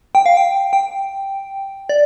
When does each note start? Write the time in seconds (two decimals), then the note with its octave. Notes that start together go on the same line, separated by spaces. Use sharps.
0.15 G5
0.26 F5
0.37 G5
0.73 G5
1.89 D5